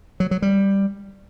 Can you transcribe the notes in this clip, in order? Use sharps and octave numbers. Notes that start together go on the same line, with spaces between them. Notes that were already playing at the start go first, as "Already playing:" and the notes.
F#3
F#3
G3